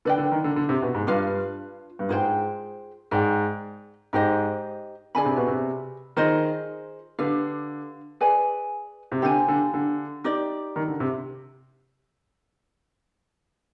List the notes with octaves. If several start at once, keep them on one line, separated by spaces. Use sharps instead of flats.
D3 B4 D5 G5
D3
D#3
D3
D3
C3
B2
G#2
G2 D4 F4 B4 F5
G2
G#2 F4 G#4 C5 G5
G#2 G#4 D5 G5
G#2 D#4 G4 C5 D#5
D3 G#4 D5 G#5 B5
C3
B2
C3
D#3 F4 G#4 C5 D#5
D3 G4 B4 F5
G#4 B4 D5 G#5
C3
D3 G4 C5 F5 G#5
D3
D3
D#4 G4 D5
D#3
D3
C3